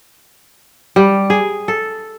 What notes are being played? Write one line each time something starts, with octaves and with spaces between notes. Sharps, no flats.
G3
G#4
A4